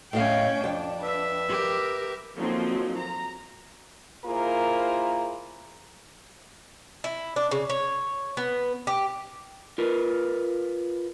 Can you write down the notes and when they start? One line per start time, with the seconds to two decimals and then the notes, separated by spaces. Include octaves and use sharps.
0.13 A2 C#4 D#5 F5 G5
0.64 F2 D4 G5
1.00 B4 E5
1.49 G4 A#4
2.36 D3 F3 F#3 A#3 C4 D#4
2.97 A#5
4.25 A#3 E4 F4 G#4 A#4 C5
7.04 E4
7.36 D4
7.51 C#3
7.70 C#5
8.37 B3
8.87 G4
9.78 F4 A#4 B4